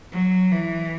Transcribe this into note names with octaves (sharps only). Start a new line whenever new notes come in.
F#3
E3